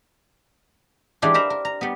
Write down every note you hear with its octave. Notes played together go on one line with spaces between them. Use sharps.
E3 G3 G#3 D4 F4 G4
A#4 C5 E5 A#5 B5
A#4
A#5
G3 B3